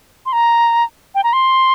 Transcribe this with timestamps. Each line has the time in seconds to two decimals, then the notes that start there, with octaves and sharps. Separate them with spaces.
0.26 C6
0.33 A#5
1.15 G5
1.24 A#5
1.33 C6